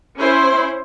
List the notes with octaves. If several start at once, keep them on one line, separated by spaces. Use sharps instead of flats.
C#4 E4 C5